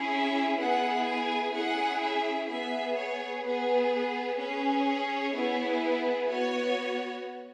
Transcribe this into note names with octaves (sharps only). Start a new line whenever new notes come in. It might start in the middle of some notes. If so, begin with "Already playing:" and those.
Already playing: C#4 E4 G#4
E5
B3 E4 G#4 F#5
G#5
C#4 E4 G#4 F#5
E5
B3 G#4 E5
C#5
B3 G#4 B4
B4
C#4 G#4 B4
C#5
B3 E4 G#4
B4
B3 F#4 C#5